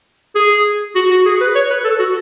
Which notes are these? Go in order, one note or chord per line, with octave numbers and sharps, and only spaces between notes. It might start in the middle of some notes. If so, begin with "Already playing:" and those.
G#4
F#4
F#4
G#4
B4
C#5
B4
A4
F#4